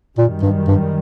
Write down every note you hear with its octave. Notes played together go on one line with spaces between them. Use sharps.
F#2 A#2 D#3 G3
G2
G2